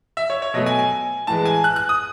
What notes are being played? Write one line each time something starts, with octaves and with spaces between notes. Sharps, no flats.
E5
C#5
C#5
B2 F#3 A3 D#5
G#5
G#5
A2 E3 G#3 A5
G#5
F#6
F#6
D#6